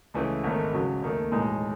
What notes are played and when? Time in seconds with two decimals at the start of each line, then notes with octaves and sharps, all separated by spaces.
0.14 C#2 C#3 E3 A3 E4
0.44 G#1 G#2 D#3 A3
0.73 C#2 C#3 F#3
1.03 D#2 D#3 A3
1.32 B1 A2 E3 G#3 D#4